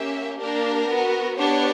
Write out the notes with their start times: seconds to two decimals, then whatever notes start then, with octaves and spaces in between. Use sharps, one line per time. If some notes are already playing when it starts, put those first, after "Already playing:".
Already playing: A#3 C#4 G4 E5
0.40 A#3 D4 G4 A#4
0.88 B3 F#4
1.38 B3 D4 G4 C#5